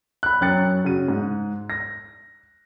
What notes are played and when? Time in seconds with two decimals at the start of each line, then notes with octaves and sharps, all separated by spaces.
0.23 B5 F#6
0.41 F#2 F#3 G5 F#6 A6 C#7
0.85 C#3 F#4 D#7
1.08 G#2
1.70 A#6